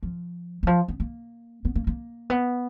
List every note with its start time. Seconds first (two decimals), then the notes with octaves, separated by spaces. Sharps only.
0.03 F3
0.63 E3
0.67 F3
0.88 B3
1.00 A#3
1.65 B3
1.75 A#3
1.87 A#3
2.30 B3